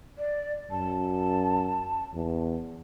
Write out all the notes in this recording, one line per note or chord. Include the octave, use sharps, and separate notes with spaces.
D5
F#2 A5
E2